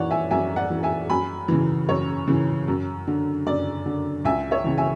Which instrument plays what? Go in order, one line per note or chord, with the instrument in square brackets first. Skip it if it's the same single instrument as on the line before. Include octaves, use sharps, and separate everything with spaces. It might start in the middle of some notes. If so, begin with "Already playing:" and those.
Already playing: [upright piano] F#2 E3 C#5 D5 F#5
E5 G#5
F#2 E5 G#5
D5 F#5
E3
E5 G#5
F#2 G#5 B5
C#3 E3
F#2 C#5
C#3 E3
F#2
D3
F#2 D5
D3
C#2 E5 G#5
C#5 E5
C#3 E3
E5 G#5